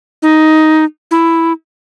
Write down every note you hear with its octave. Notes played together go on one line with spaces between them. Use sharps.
D#4
E4